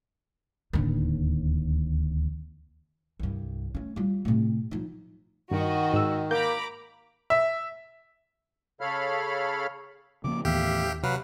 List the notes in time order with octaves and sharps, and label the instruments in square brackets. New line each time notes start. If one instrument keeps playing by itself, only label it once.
[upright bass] D1 D#2
C2 G2
A3 C#4
G3 F4
A2 C3
F3 D#4
[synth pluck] G2 [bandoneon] D#3 [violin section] F#4 D#5
[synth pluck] G#2 E6
[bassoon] A#3 [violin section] A#5 B5 D6 [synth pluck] G6
[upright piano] E5
[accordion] C#3 A4 C#5 F5 B5 F6
[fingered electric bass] C#3 F3 A#3 [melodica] D6
[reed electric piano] D#2 [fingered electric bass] A2 E3 B3 [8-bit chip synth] G4 [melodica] E5 F5
[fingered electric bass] C3 [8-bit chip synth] F#3 [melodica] B4 F5